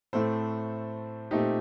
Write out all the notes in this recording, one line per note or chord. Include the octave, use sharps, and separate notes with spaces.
A2 A3 C4 A4 C5
A#2 A3 C4 D#4 G4